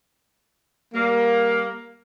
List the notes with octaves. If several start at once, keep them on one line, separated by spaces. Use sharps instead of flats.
G3 A#3